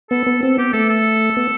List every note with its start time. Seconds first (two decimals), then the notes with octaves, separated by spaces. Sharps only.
0.11 B3 A4
0.27 B3
0.42 C4 A4
0.58 B3 G4
0.73 A3 A4
0.89 A4
1.36 B3